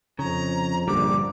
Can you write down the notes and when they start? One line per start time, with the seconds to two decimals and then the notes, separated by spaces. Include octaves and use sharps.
0.19 F2 C#3 A#5
0.88 A#1 G2 D3 G3 D6